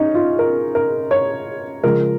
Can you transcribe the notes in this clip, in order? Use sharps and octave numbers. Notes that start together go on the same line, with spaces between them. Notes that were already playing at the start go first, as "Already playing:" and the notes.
Already playing: C#4 D#4
F4
A#4
A#4
C#5
C#3 F3 G#3 A#4